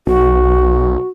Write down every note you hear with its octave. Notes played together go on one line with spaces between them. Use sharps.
B1 F#4